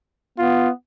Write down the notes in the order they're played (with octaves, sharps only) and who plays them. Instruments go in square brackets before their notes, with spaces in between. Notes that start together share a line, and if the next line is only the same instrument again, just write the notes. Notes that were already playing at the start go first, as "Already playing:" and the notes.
[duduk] B3 [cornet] F4